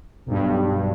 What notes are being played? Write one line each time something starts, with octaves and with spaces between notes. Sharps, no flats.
B1 G2